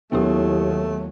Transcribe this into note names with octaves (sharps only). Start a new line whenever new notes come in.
D#2 F#3 A3 B3 E4 G4